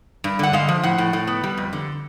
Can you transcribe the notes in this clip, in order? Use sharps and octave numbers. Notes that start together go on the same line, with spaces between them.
G2
D3 F#5
G#3 F5
F3
A2 F#5
A2
A2
B3
G3
F2
D3